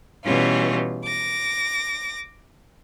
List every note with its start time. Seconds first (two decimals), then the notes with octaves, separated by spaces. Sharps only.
0.24 B2 E3 G3 C#4 F4
1.03 D6 A#6